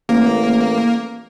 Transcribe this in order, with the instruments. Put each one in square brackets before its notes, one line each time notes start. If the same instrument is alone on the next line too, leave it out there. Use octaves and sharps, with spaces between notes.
[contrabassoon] A1 [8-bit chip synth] A#3